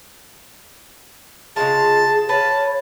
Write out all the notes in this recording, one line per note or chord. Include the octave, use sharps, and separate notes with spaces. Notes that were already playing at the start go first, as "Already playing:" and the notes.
C#3 G#3 F4 G#4 A5
B4 C#5 F5 A5